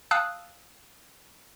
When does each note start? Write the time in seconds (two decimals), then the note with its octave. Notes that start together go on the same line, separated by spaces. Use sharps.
0.11 F5 G5 A5 D#6 E6 F#6